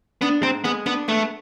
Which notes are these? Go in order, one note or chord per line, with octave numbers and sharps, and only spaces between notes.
B3 D4
G#2 C4
G#3 B3
B3 D4
A3 B3